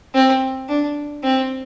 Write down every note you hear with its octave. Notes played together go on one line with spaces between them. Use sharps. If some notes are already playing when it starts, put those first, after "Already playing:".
C4
D4
C4